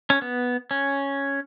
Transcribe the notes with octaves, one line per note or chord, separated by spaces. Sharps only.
C#4
B3
C#4